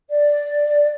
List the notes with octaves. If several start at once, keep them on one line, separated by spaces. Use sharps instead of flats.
D5